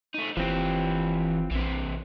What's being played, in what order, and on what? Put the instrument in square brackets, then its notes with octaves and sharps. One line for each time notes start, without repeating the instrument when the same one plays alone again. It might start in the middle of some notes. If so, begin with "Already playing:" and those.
[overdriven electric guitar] A3 D#4
[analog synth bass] F#1 [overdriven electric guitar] E3 G4 [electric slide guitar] F3 C4
[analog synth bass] A#1 [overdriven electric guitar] C3 E3